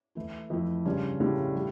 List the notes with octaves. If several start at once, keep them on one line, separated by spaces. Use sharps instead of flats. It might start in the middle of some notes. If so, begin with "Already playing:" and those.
E3 A3 E4
F2 E3 A3 E4
G2 C#3 G3 C#4 F4
A2 C#3 G3 C#4 F4
G3